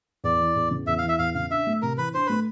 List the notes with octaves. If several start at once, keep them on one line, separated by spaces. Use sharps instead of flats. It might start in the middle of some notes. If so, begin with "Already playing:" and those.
E2 D5
E3
E2
C#3
E2 E5
F5
E3
E5
E2 F5
C#3 F5
D4 E5
A3
C3 A#4
E3 B4
D4 C5
A3 B4